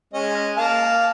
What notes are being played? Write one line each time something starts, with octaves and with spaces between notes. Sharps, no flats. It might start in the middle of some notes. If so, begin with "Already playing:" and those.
G#3 C#4 D#5
A#3 F5 A5